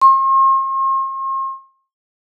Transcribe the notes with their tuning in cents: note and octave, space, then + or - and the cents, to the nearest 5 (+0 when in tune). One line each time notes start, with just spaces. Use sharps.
C6 +45